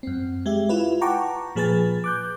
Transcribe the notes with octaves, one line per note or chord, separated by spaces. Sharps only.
F#2 C4
G#3 G4 E5
E4 F4 B4
F#5 G5 A5 A#5 C#6 D6
A#2 F3 G#4 B4 G#5 A6
D6 F#6 G6